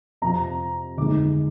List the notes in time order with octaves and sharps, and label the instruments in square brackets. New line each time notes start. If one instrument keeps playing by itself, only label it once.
[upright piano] F2 C3 F3 A#5
G1 F2 D#3 G#3 D6